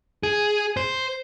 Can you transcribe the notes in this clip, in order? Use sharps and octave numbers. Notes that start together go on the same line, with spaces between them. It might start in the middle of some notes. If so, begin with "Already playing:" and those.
G#4
C5